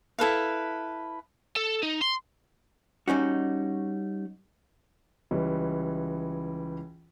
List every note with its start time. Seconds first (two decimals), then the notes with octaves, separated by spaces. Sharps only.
0.19 E4 A4 B4 F5
1.56 A4
1.83 D#4
2.02 C6
3.08 G3 C#4 D#4 F#4
5.31 C#2 E3 G3 C#4